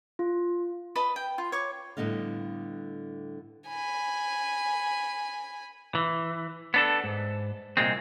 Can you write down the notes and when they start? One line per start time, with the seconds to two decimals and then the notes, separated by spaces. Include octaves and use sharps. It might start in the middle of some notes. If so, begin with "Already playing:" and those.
0.19 F4
0.95 B4 D#5 A5 B5
1.16 G5
1.38 F4
1.52 C#5 C#6 D6
1.97 A2 D3 G3 B3 D#5 F5
3.68 G#5 B5
5.95 E3
6.74 B3 D4 A4
7.04 G#2
7.77 C2 A#2 G#3 C4